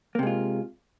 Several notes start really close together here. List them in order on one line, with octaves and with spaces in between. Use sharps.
A#3 C3 G#3 F4